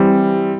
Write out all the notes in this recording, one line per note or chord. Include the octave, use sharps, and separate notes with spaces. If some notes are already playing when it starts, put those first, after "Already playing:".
Already playing: E3 G3 C4